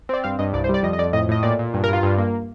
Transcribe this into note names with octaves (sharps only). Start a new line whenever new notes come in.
C4 D5
G2 F5
G2 D#5
C2 D5
C5
G3
D5
F2 D#5
D#5
F2 D5
A2 D#5
A2 D#5
A#2 D5
A#2
G2
A#4
G2 F4
G2
A#3